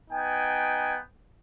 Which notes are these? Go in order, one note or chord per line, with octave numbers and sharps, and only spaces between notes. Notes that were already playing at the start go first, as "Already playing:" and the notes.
B3 D#4 G5 G#5